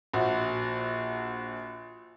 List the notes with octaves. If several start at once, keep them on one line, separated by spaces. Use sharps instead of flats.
A#1 F#4